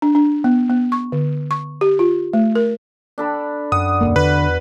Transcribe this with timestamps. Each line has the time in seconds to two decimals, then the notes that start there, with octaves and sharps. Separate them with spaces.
0.02 D4
0.15 D4
0.44 B3
0.70 B3
0.92 C#6
1.12 D3
1.51 C#6
1.81 G4
1.99 F4
2.33 A3
2.55 A#4
3.18 D4 A4 B5
3.72 F#2 F#5 D#6
4.01 D#1 C#2 A#3
4.16 E2 D3 F#4 B4